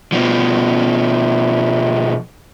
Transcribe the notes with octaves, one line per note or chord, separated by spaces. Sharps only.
B2 F3